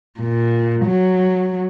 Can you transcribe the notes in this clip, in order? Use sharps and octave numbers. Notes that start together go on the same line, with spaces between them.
A#2
F#3